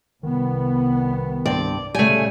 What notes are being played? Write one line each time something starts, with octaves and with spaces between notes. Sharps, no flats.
C2 D#3 B3
G2 C4 D5
A#2 C#3 G3 A3 G5 G#5